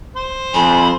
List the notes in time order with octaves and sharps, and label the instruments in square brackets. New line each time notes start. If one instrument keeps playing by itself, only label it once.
[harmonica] C5
[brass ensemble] F2 [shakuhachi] G#5 [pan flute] B5